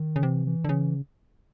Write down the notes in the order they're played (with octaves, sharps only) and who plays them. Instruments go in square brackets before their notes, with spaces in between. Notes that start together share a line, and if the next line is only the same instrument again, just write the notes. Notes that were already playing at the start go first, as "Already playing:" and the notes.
Already playing: [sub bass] D#3
[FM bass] C#3
[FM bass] C3 [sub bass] E3
[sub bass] E3
[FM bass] D3
[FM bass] C#3 [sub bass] E3